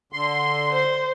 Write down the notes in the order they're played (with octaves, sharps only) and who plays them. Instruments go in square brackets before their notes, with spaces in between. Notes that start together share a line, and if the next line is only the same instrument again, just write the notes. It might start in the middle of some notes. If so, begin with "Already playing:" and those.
[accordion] D3 C6
[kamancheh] C5